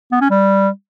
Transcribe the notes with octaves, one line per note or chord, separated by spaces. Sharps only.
B3
C#4
G3